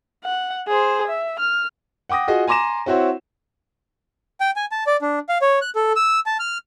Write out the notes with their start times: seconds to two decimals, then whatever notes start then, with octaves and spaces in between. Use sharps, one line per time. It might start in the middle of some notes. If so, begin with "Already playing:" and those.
0.24 F#5
0.67 G#4 C5
1.07 E5
1.39 F6
2.09 F#5 G5 D6 D#6 A#6
2.28 F4 F#4 G#4 D#5
2.47 G#5 A#5 C6 D6 A#6 E7
2.86 C4 E4 F#4 C5 C#5
4.40 G5
4.56 G#5
4.71 A5
4.87 D5
5.02 D4
5.29 F5
5.42 C#5
5.62 F#6
5.75 A4
5.96 E6
6.26 A5
6.40 F6